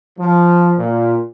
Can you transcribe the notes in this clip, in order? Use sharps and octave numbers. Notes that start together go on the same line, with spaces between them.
F3
A#2